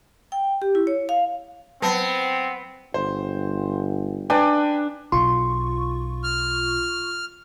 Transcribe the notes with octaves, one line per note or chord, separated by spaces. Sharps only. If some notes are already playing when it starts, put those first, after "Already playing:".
G5
G4
E4
C#5
F5
F#3 B3 C4 A5 A#6
G1 C5
D4 B4 G5 G#5
B1 F4 C6 C#6
F6